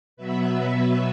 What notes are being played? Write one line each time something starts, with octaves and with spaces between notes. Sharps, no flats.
B2 F#3 B3 B4 E5